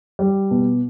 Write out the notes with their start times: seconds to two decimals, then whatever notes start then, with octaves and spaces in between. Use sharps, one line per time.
0.19 G3
0.51 B2